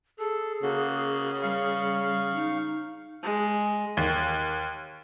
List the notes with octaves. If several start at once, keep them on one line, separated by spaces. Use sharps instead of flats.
G#4 A4
C#3 A#3 F#4
G3 F5 C#6
D#4
G#3
D#2